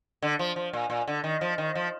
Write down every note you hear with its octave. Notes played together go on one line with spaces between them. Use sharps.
D3
F3
F3
A#2
A#2
D3
D#3
F3
D#3
F3